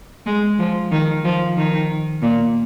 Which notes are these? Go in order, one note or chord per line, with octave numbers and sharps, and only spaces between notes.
G#3
F3
D#3
F3
D#3
A#2